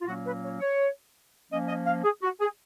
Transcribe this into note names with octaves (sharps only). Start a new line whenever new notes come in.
F4
A#2 F#3 A#3 C#4 F#4
B4
C#5
C#5
F3 A#3 C#4 D#5
D#5
F5
G#4
F#4
G#4